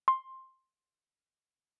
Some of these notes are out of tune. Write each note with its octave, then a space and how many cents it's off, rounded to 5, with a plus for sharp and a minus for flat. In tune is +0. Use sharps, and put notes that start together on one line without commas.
C6 +10